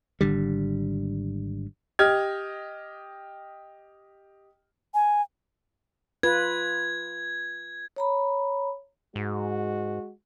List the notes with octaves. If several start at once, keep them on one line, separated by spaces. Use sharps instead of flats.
G#1 D3 G3
G4 D#5 F6 G#6
G#5
F4 B4 G#6
C#5 A#5 B5
G#2 G#3 F#4